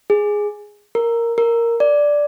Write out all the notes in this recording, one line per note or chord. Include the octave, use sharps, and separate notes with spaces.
G#4
A#4
A#4
D5